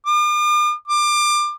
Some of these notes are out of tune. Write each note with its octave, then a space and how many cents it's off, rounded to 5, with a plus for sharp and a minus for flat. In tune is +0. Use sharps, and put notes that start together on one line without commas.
D6 +45
D6 +25